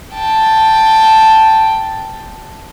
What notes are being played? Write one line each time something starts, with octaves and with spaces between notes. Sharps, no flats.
G5 A5